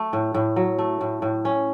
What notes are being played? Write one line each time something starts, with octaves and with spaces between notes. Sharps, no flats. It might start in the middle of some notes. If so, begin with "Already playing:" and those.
Already playing: A3
A2
A2
F#3
A3
A2
A2
C#4